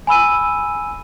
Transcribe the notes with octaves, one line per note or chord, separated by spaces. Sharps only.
G#5 B5 E6 D#7